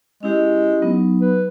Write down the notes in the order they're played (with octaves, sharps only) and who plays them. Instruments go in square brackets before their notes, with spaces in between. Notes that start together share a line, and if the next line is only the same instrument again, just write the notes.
[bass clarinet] G#3 [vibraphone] C#4 E4 G4
[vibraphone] F#3 B3 D#4
[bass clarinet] B4